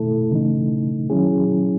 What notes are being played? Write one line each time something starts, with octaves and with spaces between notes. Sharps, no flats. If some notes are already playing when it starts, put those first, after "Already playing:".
Already playing: B2 A3 E4 A4
C#3 E3 A3 D#4
D#3 F#3 C#4 E4 G#4